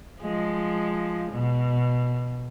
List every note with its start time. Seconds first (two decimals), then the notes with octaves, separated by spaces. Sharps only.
0.21 F3 G#3
1.32 B2